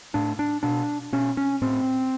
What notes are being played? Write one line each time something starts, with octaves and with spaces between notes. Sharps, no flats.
A2 D4
D4
B2 D4
B2 C#4
C#4
A2 C4